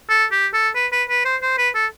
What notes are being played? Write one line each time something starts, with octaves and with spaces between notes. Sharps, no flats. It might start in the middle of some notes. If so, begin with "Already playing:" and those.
A4
G4
A4
B4
B4
B4
C5
C5
B4
A4